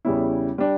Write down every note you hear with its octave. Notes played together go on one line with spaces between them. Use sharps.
E2 C#3 G3 C#4 E4
G3 D4